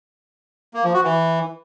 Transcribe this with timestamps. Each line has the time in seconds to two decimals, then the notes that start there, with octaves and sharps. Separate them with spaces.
0.74 A#3
0.84 F3
0.94 F#4
1.04 E3